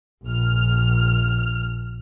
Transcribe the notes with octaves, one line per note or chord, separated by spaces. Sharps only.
A#1 F6